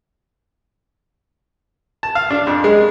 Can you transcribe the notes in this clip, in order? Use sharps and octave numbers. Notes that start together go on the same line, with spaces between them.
A5
F5
D4
F2
G#3